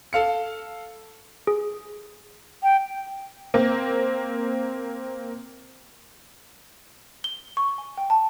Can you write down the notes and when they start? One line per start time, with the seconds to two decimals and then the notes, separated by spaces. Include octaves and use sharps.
0.13 A4 F5 C#7
1.47 G#4
2.63 G5
3.54 A#3 C4
7.24 G7
7.57 C#6
7.78 G#5
7.97 G5
8.10 A5